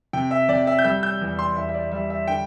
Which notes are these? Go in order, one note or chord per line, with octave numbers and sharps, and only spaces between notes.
C3 G5
E5
C3 D5
E5
G6
G3 E6
G6
E2
C6
E2 E5
E5
D5
G3 E5
E5
D3 G5